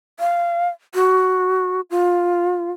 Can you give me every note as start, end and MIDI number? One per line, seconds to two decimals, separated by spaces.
0.20 0.69 77
0.95 1.81 66
1.91 2.71 65